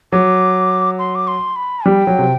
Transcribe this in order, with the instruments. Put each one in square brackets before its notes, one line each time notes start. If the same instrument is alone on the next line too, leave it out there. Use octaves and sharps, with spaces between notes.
[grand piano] F#3 [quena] D6
[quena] C6
D6
C6
B5
[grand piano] G3 [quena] G5
[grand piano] F#3
C3